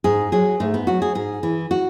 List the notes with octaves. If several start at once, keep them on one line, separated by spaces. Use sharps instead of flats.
G#2 G#4
F#3 G#4
G#2 A3
B3
F#3 F#4
G#4
G#2 G#4
E3
F#4